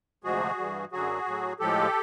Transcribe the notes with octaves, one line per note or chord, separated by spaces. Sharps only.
D2 C3 F3 G#3 F#4 G#4
G2 E3 G3
F#2 D3 F#3 F#4 G#4
A2 F#3
A2 F3 G#3 G4 A4